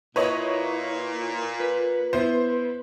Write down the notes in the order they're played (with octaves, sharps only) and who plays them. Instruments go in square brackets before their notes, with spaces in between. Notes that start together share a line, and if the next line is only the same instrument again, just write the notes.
[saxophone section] A#2 [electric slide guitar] E4 [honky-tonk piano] B4 C#5 D#5
[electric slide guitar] B4
[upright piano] B3 E4 [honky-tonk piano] C5